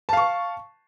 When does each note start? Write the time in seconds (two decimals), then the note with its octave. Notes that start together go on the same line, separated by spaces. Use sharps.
0.09 A5
0.13 F5
0.17 C#6